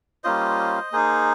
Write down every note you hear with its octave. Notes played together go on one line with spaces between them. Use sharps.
G3 A#3 C#4 F4 C5 D#5
A#3 D#4 G#4 C5